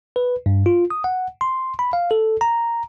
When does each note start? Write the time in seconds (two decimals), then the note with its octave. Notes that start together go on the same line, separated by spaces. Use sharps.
0.16 B4
0.46 G2
0.66 F4
0.90 D#6
1.04 F#5
1.41 C6
1.79 B5
1.93 F5
2.11 A4
2.41 A#5